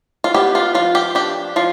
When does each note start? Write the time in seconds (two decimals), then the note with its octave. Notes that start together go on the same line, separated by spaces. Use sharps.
0.24 F4
0.34 B3 G4
0.55 F4
0.75 F3 F4
0.95 G4
1.15 D4 G4
1.56 F3 F4